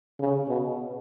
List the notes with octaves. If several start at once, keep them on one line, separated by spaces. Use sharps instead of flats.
C#3
B2